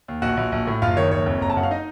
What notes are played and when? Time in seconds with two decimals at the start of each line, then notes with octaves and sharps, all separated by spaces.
0.08 D#2
0.22 A#1 F#4 F#5
0.37 A#1
0.52 A#1
0.67 A2
0.82 F#1 F4 F5
0.97 D#3 C#5
1.11 F#1 C#5
1.26 F2
1.41 F#1 A#5
1.50 A5
1.57 F#2 F#5
1.63 F5
1.71 D#4 D#5